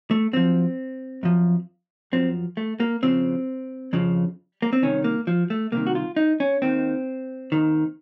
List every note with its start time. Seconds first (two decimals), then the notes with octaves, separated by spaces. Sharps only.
0.11 A3
0.33 F#2 F3 C4
1.23 F#2 F3
2.12 F#2 F3 C4
2.57 A3
2.80 A#3
3.02 F2 C#3 F3 C4
3.93 F2 C#3 F3
4.62 A#3
4.73 C4
4.82 C2 C3 D#3 C#4
5.04 A#3
5.27 F3
5.50 A3
5.72 C2 C3 D#3 A#3
5.87 F#4
5.95 F4
6.16 D#4
6.40 C#4
6.62 D#2 D#3 C4
7.52 D#2 D#3